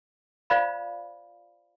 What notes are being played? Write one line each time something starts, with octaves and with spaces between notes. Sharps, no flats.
F4 C5 D5 F5 B5